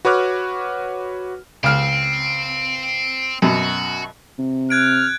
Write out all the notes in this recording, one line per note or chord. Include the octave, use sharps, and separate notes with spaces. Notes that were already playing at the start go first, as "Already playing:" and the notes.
F#4 B4 C#5 D6 F6 F#6
C#2 C4 F6
F#2 B2 F#4
C3
F6 F#6 G#6 D7